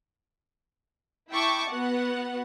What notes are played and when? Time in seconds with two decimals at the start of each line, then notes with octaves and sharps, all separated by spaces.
1.31 E4 E5 G5 A5 C#6 D6
1.70 B3 F#4 F#5